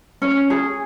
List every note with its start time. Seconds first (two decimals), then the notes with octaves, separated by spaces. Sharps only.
0.22 C#4
0.50 G#4